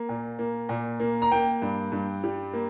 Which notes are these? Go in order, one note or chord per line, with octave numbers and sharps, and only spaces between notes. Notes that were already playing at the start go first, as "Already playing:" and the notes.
Already playing: A#3
A#2
A#3
A#2
A#3
A#5
A#3 G5
G2
G2
G3
A#3